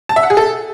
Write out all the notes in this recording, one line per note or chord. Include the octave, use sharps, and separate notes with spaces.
A5
E5
F#5
G#4
A4